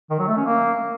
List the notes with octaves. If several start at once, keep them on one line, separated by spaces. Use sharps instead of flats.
D#3
F#3
A3
C#4
A#3